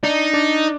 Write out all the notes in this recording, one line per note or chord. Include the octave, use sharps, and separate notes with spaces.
D4 D#4 D5
D4 D5